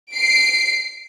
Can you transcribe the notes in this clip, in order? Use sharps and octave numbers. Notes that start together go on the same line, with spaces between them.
C7 D7